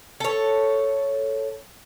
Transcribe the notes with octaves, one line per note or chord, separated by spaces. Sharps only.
A4 C#5